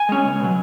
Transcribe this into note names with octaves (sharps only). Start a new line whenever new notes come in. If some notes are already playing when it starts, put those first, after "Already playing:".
Already playing: G#5
G#3 C#4
C#2
B2 F#3